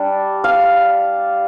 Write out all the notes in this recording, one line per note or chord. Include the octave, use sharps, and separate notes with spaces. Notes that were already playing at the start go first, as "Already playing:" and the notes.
Already playing: G3 D4
F5